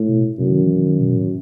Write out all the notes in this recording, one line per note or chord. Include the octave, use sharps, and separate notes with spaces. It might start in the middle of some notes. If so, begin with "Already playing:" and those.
Already playing: A2
B2
F#2 C3
D#3
E3
D#3
B2
A2